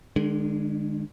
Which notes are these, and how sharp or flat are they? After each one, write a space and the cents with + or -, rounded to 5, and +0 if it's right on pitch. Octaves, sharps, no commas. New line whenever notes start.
D#3 -45 G#3 +0 D4 +0